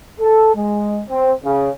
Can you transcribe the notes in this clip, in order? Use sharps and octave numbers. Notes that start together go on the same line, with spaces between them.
A4
G#3
C4
C#3